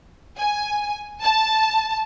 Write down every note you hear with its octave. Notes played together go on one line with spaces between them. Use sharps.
G#5
A5